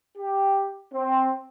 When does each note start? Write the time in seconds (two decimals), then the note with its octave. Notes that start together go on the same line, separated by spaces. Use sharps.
0.17 G4
0.92 C4